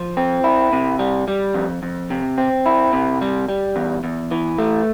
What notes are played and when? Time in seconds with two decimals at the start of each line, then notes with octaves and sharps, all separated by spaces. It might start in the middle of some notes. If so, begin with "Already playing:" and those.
Already playing: F3
0.17 C4
0.44 E4
0.73 C3
0.99 G3
1.28 G3
1.54 F2
1.83 F2
2.10 C3
2.38 C4
2.66 E4
2.93 C3
3.21 G3
3.49 G3
3.76 E2
4.04 E2
4.31 E3
4.58 A3